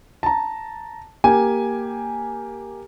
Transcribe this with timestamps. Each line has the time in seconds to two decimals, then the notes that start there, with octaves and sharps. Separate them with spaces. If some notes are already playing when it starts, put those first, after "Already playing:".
0.23 A5 A#5
1.24 A#3 G4 G#5